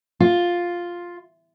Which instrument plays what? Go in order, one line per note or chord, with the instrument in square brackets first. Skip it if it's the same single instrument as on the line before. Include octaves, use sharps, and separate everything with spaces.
[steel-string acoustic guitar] F4